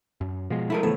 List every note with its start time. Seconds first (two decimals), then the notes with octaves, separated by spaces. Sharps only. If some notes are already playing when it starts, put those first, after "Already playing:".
0.21 F#2
0.50 B2 F3 G#3
0.70 E4 A4 A#4
0.83 A2 C#3 E3 F3 B3 A4